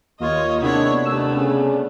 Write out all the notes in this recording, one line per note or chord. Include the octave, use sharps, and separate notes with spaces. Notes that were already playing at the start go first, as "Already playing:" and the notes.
D#2 A#3 F4 C#5 D#5
C3 D#3 G#3 B3 D4 E4 C#5
D#2 A3 B3 E6
C#3 C#4